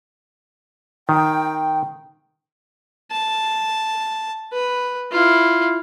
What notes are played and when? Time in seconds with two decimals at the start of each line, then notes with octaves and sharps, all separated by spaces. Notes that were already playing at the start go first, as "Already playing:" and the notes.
1.09 D#3 G5
3.11 A5
4.53 B4
5.11 E4 F4